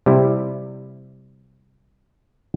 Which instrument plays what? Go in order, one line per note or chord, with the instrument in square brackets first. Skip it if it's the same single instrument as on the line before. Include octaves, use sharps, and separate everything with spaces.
[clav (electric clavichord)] C3 G3 E4